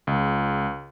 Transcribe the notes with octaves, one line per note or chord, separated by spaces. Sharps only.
C#2